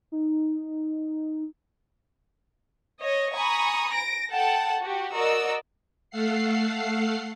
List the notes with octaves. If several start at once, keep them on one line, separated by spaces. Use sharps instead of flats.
D#4
C#5 D#5
G#5 A#5 B5 C#6 D#6
A#6 D7
A4 F#5 G5 A5
F#4 G4
F#4 A#4 D5 D#5 E6
A3 A4 F5 F#5 C7